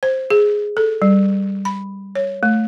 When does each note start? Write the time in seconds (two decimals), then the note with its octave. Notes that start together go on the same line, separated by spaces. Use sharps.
0.03 C5
0.30 G#4
0.77 A4
1.02 G3
1.65 B5
2.15 C#5
2.43 A3